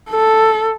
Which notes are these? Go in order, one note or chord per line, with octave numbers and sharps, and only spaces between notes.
A4